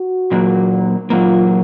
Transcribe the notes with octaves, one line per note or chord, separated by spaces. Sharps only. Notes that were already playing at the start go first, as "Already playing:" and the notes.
Already playing: F#4
A#2 F#3 A#3
A#2 F#3 A#3 F4